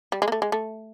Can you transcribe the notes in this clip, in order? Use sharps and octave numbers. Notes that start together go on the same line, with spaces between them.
G3
G#3
A#3
A3
G#3
A3